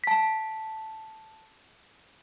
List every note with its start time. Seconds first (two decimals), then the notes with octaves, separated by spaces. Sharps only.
0.04 A5 B6